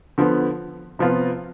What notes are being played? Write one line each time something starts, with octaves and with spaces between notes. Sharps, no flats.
D3 F3 B3
C3 F3 B3 F4